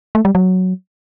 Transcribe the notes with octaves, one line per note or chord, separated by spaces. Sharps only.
A3
G3
F#3